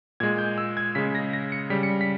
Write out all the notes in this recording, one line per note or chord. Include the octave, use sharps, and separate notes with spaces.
A#2 G#3 G#6
G6
E6
G#6
C#3 G#3 B6
A#6
A#6
C#7
C#3 G3 B6
C#7
B6